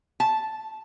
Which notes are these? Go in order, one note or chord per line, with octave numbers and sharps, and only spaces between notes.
A5